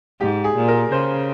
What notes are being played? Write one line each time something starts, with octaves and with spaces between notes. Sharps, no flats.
G#2 G4
G#4
A#2
A#4
C#3 C5